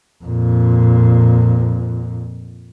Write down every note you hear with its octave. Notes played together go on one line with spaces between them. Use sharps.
F2 A#2